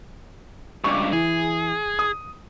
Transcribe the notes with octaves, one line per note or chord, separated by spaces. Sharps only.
C#2 G2 C#6 D6
E3 G#4
D#6